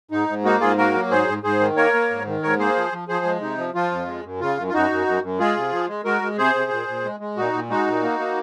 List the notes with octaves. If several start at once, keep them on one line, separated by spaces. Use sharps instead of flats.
G#2 D#4
G#2
A#3 D#4 F#4
G#2 F4 G#4
A#3 F#4 A#4
F#3
G#2 G#4 C5
G#2
G#2 G#4 C5
D#3
A#3 A#4 C#5
A#3
G#2
D#3
G#2 A#4 C#5
A#3 G#4 C5
F3
F3
F3 G#4 C5
G#3
C3 D#4
F3
F3 F4
F2
G#3
F#2
C#3 F4
F#2
F4
F#2 D#4 F#4
F#2
F#2
F#2
G#3 F4 G#4
C3
F3
G#3
G#3 F#4 A#4
G#3
C3 G#4 C5
C3
A#2
A#2
G#3
G#3
A#2 D#4 F#4
A#2
G#3 D#4 F#4
A#2
A#3
A#3